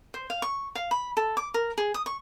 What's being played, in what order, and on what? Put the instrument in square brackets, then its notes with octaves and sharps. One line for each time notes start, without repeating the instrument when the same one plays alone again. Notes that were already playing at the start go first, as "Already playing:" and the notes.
[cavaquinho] C5
F5
C#6
F5
B5
A4
D6
A#4
G#4
D#6
C#6